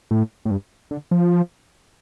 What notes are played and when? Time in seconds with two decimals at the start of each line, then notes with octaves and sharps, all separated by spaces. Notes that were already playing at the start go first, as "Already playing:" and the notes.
0.11 A2
0.45 A2
0.51 G2
0.91 D3
1.11 F3